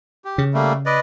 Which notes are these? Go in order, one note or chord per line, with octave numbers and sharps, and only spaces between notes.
G4
C#3
G3 A3 A#3
B4 D5 D#5